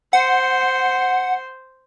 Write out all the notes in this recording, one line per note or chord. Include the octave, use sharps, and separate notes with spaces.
C5 F#5